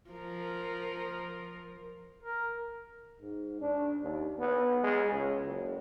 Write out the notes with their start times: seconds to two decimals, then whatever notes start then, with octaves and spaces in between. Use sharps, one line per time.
0.11 F3 A#4
2.23 A#4
3.21 G#2
3.61 D4
4.02 D#2
4.39 B3
4.83 G#3
5.12 C#2
5.45 F#1